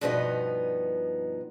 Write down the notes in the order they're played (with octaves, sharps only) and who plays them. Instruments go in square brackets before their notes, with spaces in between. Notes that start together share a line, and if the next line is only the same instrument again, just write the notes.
[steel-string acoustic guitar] G2 B2 F3 B3 D4 D#4